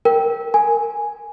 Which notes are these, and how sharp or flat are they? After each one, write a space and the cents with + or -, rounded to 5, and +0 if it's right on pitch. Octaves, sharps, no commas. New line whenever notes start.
A#4 +0 G5 +0
A#4 -25 G#5 +0